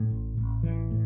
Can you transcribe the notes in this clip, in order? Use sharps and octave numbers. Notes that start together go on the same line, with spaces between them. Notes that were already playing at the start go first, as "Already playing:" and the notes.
Already playing: A2
A1
A1
E3
A2